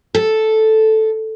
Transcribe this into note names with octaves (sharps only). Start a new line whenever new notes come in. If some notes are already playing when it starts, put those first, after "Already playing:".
A4